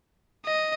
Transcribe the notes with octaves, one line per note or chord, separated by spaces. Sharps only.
D#5